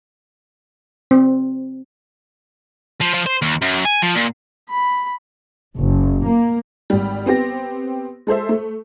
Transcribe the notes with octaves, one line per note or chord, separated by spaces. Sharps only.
C4
F3
F3
C5
D#2
F#2
G#5
F3
A#2
B5
F#1
A#3
G#1 G3
B3 C4 G4 A#6
G#3 A4 C5 E5
A3